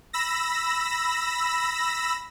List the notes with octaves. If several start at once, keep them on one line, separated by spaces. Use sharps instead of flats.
B5 E6 A#6